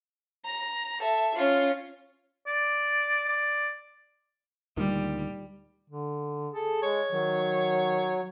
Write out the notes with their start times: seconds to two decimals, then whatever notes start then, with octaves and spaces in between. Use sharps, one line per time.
0.45 A#5
1.00 A4 E5
1.35 C#4 F4
2.47 D5
3.29 D5
4.77 D2 A#2 D#3 G3
5.90 D3
6.54 G#4 A4
6.83 G#3 C#5
7.12 D#3 F#3